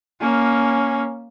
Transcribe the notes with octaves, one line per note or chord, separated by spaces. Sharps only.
A#3 C#4